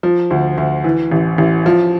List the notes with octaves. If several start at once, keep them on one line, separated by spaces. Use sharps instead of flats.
F3
D2
D2
E3
A1
A1
F3